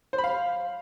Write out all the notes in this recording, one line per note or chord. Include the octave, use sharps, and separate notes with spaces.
C5
B5
F5